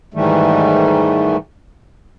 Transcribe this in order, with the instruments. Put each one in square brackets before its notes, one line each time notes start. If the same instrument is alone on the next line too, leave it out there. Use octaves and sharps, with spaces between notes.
[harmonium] G#2 D#3 E3 G3 A3